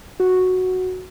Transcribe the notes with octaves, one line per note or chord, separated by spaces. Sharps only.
F#4